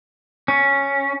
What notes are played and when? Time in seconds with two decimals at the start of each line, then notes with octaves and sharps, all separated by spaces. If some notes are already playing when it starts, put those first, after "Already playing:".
0.48 C#4